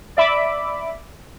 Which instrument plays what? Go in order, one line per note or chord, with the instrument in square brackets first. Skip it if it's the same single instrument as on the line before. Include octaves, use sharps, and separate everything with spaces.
[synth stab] D5 E5 B5 D6